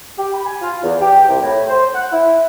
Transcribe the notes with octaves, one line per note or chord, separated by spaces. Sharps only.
G4
B5
G#5
F4
E2
G4
C2
A2
C5
F#5
E4